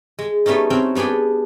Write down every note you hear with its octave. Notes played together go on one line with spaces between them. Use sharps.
G#3
G3 A3 B3 C#4 D#4
C4 C#4 F#4 G5
G3 B3 D4 G#4 G5